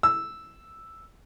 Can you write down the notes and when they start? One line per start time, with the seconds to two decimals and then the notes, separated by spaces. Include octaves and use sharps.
0.03 E6